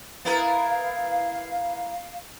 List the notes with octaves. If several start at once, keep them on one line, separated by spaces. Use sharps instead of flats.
B3 E4 A#4 F5